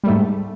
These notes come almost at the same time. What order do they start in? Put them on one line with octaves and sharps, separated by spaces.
G3 A3 G#2